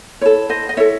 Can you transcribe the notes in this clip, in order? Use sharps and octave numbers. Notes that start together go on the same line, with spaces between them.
E4 A4 C#5
C5 D#5
D#5
E4 A4 C#5 E5